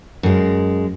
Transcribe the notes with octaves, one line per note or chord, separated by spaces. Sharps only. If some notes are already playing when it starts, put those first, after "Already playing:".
F#2 G#3